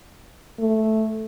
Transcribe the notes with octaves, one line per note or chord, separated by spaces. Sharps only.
A3